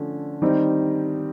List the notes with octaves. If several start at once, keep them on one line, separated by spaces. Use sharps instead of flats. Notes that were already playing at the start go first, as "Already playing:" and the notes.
Already playing: D3 F3 A3 C#4
D#3 G3 C4 D#4